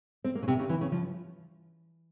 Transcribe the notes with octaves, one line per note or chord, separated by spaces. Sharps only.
C4
A#3
C#3
C3
C#3
E3
C#3
F3